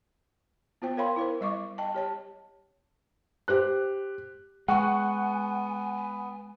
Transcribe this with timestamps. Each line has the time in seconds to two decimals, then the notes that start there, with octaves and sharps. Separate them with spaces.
0.82 B3 F4 C5 G5
0.97 A#4 C#5 F5 G5 B5 C6
1.16 E4 A#4 C5
1.41 G3 D#5 C#6 D6
1.78 D#5 G5 A5
1.94 G4 C#5 A5
3.48 G4 C5 F#6
4.68 G#3 B3 F#5 G#5 C#6